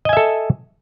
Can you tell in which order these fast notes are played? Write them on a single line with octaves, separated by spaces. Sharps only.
D#5 G#5 E5 A4